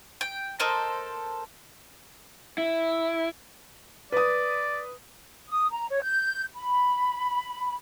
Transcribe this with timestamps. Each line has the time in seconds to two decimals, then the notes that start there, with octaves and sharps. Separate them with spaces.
0.21 G5
0.60 A4 A#4 C5 D#5
2.58 E4
4.12 B4 D5 D#6
5.50 D#6
5.71 A#5
5.88 C#5
6.02 G6
6.55 B5